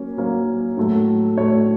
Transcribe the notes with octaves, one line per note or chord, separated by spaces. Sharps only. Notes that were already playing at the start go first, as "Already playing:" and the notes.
Already playing: F#3 A#3 C#4
F#3 A#3 C#4
A2 F#3 A3
A2 F#3 A3 C#5